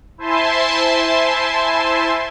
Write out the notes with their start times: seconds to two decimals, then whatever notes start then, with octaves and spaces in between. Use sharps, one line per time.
0.18 E4 C5 E5 G#5 A5 C6